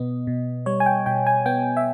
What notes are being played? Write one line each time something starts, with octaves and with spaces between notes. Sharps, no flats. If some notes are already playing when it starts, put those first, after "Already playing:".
Already playing: B2 B3 D#5
B2
G3 C#5
G#5
G5
B2 G5
G#5
B3 G5
E5